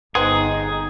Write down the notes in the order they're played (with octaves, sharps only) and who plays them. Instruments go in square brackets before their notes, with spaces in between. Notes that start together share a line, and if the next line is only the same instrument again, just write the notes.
[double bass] G1 D#4 [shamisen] B3 C4 [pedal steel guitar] G#4